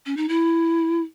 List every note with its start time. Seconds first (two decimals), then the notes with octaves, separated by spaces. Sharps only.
0.06 C#4
0.17 D#4
0.29 E4